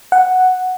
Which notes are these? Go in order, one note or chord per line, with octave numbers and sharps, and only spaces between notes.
F#5